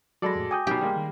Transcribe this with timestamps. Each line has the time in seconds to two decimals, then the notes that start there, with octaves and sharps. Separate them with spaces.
0.22 F#3 G#3 F#4 A4 D5 B5 A#6
0.35 F2 A2
0.51 G5 G#5 D6 D#6 G6
0.67 B2 D#3 F#3 G4
0.81 G3 G#3 A#3
0.96 D#3